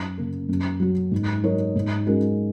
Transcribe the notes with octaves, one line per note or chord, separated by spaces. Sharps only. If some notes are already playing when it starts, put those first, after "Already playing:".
Already playing: F#2
C#3 A#3
F#2
F#3 C#4 F#4
G#2
F#3 D#4 A#4 C#5
G#2
G#3 C#4 F#4 A#4